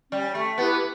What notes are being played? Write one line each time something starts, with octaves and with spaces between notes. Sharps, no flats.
G3 C#4
A3
B3 E4 G4 B4